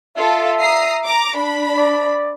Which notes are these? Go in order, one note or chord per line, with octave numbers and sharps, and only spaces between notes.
F4 A4 E5
A#5 D#6 C7
A#5 D6
D4 B5
D5